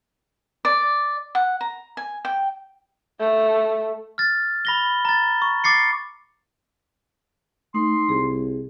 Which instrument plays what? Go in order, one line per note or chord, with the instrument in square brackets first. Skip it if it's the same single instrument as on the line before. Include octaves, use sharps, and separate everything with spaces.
[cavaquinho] D5
F#5
A#5
G#5
G5
[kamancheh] A3
[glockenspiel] F6 A6
B5 A#6 G7
A#5 A6
C#6
D6 A6 C7 C#7
[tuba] A3 [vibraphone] D#4 [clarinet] C6
[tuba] C2 [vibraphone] G#4